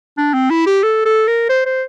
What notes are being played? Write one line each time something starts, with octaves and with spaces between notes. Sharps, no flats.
D4
C4
E4
G4
A4
A4
A#4
C5
C5